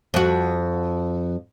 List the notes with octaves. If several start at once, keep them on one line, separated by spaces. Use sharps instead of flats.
F2 F#4